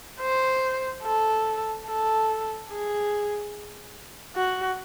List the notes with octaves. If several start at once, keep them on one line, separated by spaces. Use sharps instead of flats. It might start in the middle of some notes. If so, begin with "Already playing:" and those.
C5
A4
A4
G#4
F#4